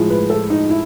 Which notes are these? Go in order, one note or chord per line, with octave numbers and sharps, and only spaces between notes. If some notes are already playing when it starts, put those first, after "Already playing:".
Already playing: A2 F3 G#3
B4
A4
D#4
E4